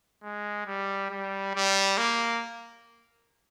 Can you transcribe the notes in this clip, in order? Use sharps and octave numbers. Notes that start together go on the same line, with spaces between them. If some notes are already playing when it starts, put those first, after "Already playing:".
G#3
G3
G3
G3
A#3